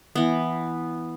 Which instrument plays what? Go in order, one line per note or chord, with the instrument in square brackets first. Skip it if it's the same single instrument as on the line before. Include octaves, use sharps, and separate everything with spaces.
[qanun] E3 B3